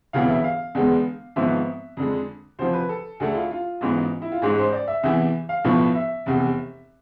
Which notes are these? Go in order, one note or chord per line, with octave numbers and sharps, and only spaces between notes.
E1 D2 C3 E3 B3 F5
E5
F5
E2 D3 G#3 B3
G#1 G#2 F3 B3 E5
F2 D3 G#3
D2 C3 F3 C5
B4
A4
D2 D3 A3 G#4
F4
F4
A1 G#2 E3 B3
E4
F4
A1 G#2 G#3 G#4
C5
D5
E5
E2 C3 E3 E5
F5
B1 A2 F3 B3
E5
F1 E2 C3